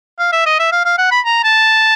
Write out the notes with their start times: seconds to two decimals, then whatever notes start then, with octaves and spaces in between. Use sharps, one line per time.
0.19 F5
0.32 E5
0.46 D#5
0.59 E5
0.72 F5
0.85 F5
0.98 F#5
1.11 B5
1.25 A#5
1.44 A5